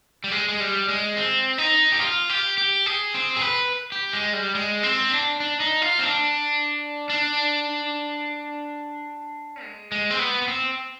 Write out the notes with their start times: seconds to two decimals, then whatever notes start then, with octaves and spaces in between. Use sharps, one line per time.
0.24 G3
0.32 G#3
0.49 G#3
0.60 G3
0.88 G#3
1.17 C4
1.58 D#4
1.92 G4
2.01 F4
2.30 G4
2.58 G4
2.86 G#4
3.14 C4
3.36 G#4
3.41 B4
3.92 G4
4.13 G#3
4.33 G3
4.55 G#3
4.83 C4
5.11 D4
5.40 D4
5.60 D#4
5.82 F4
5.99 C4
6.03 D4
7.10 D4
9.63 G#3
9.92 G#3
10.10 C4
10.19 B3
10.42 B3
10.48 C4